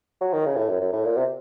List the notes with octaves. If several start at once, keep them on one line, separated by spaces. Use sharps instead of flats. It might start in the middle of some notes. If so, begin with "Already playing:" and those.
F#3
D#3
C#3
A2
F#2
F#2
A2
A#2
C3